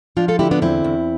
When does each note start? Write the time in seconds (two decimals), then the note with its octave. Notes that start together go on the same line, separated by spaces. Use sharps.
0.17 F3 D4 F4
0.28 F4 A4
0.39 D3 E4 G4
0.51 B3 D4
0.62 E2 C4 E4
0.84 E2